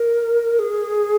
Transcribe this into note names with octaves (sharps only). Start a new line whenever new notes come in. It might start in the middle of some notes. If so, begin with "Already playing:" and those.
Already playing: A#4
G#4